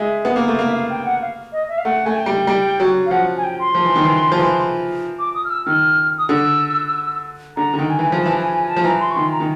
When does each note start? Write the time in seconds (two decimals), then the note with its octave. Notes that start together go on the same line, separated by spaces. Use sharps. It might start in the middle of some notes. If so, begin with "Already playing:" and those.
Already playing: G#3 E5
0.25 B3
0.36 A#3
0.48 A3
0.58 A#3 F5
0.66 E5
0.73 F5
0.90 G5
1.05 F#5
1.21 F5
1.52 D#5
1.69 E5
1.78 F5
1.84 A3 F#5
2.05 A3 G#5
2.16 G5
2.26 G3
2.47 G3
2.80 F#3
3.06 F5
3.11 F3 F#5
3.37 G#5
3.44 G5
3.59 C6
3.75 F3
3.85 E3
3.95 D#3
4.04 E3
4.32 F3
4.39 E3
5.19 D6
5.34 D#6
5.44 F6
5.50 E6
5.66 D#3 F6
6.18 D#6
6.29 D3 E6
7.56 D3 A#5
7.73 D3
7.78 D#3 G5
7.89 G#5
7.99 E3
8.12 F3
8.20 A5
8.26 E3
8.36 G#5
8.52 G#5
8.68 A5
8.76 F3
8.84 E3 A#5
9.00 C6
9.11 C#6
9.15 D#3 C6
9.32 A#5
9.40 D#3